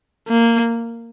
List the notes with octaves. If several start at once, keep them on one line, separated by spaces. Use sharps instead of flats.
A#3